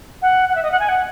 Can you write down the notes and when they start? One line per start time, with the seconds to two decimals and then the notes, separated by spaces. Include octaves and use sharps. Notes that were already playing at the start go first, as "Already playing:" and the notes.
0.22 F#5
0.49 F#5
0.55 E5
0.63 D#5
0.72 F#5
0.80 G#5
0.89 F#5